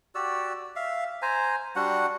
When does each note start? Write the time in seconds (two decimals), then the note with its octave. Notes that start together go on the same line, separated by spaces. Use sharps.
0.15 F#4 G4 D5 E6
0.76 E5 F5
1.22 C5 G#5 A#5
1.76 G3 D4 F#4 F#5